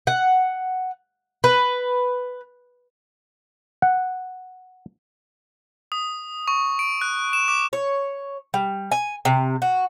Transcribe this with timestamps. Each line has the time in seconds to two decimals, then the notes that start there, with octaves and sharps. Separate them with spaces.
0.07 F#5
1.44 B4
3.82 F#5
5.92 D#6
6.48 C#6
6.79 D7
7.01 F#6
7.33 E7
7.48 D6
7.73 C#5
8.54 G3
8.91 G#5
9.25 C3
9.62 F#4